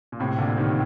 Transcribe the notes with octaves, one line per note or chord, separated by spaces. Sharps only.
A#2
A2 C3
A#2 D3
C3 D#3